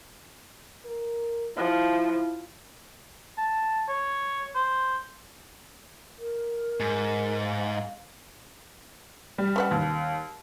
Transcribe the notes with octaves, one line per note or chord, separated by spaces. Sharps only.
A#4
F3 E4
A5
C#5
C5
A#4
G#2
F5
G3
C#4 B4 F#5
D#2